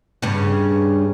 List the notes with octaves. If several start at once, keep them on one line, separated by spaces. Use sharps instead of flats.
G2 C#3